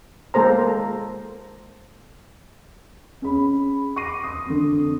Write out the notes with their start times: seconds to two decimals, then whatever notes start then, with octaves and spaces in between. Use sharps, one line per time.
0.34 G#3 A#3 A4 C5 A#5
3.22 C#4 G#4 B5
3.96 C#6 D6 A#6 C7 D#7
4.24 C6 D#6
4.46 F2 D3